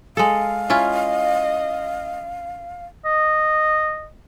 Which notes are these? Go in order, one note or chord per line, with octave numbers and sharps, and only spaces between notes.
G#3 A4 F5
C#4 E4 F4 D#5
D#5